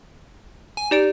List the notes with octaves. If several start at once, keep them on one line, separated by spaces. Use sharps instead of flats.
G#5
D#4 G4 D5 D7